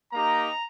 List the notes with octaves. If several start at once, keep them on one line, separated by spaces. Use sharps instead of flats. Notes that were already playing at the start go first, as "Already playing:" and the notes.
A#3 D#4 G4 A#5